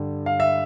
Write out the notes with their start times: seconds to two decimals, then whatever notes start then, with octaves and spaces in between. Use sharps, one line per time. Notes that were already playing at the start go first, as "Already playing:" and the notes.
Already playing: G2 D3 G3
0.26 F5
0.40 E5